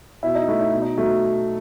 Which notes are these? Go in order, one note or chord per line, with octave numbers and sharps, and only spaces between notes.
B2 E4 E5
D#4 D#5
A3 E4
D#4
B2
D#4
F#3 A3